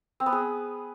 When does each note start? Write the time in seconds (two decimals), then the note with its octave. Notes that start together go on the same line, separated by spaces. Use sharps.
0.20 C4
0.26 B3
0.32 G#4